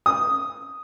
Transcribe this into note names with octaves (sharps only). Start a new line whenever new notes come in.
D#6